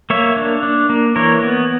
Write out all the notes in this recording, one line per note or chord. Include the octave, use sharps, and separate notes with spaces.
A#3 C#5 E5
D4
D4
A#3
E3 A#4 C#5
B3